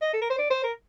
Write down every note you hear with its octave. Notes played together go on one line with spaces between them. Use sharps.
D#5
A4
A#4
C5
D5
C5
A#4